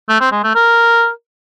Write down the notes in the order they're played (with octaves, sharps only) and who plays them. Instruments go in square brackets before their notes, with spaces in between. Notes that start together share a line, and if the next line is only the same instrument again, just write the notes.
[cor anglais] A3
C4
G#3
A3
A#4